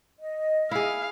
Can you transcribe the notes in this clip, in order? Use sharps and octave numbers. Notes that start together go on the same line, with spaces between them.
D#5
E4 G#4 F5